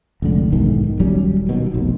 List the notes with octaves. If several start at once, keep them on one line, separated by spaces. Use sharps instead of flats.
F1 C#2 D3
B1 G#2 D#3 E3
D#1 F#3 G3 C#4
D#2 B2
F1 B1